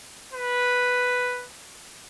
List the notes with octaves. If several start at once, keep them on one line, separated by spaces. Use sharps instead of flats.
B4